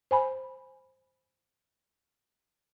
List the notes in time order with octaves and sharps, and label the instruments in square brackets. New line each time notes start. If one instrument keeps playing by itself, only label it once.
[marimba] C5 G#5 B5